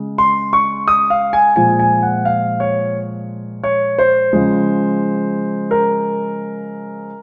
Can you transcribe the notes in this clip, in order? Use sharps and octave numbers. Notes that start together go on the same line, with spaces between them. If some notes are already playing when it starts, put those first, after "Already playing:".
Already playing: C#3 G#3
C6
C#6
D#6
F5
G#5
A#2 F3 G#3 G#5
G#5
F#5
F5
C#5
C#5
C5
C#3 F3 G#3
A#4